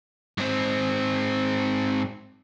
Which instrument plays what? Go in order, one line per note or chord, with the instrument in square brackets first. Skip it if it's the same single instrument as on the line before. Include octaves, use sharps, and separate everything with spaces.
[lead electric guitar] G#2 C4